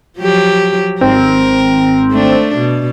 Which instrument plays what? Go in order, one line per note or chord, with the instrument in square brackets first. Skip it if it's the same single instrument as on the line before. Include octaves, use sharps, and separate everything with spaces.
[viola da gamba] F3 F#3 G4
[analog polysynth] G#1 C4 [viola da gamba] A#4
[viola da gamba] A3 D4
B2